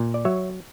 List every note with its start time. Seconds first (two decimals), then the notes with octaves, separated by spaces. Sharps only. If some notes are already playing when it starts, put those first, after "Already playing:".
Already playing: A#2
0.14 D5
0.25 F#3 C#5 E5